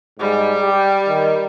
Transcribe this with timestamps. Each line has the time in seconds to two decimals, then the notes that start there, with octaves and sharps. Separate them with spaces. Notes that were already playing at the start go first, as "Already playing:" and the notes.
0.20 G#2 G3
0.61 G4
1.08 D#3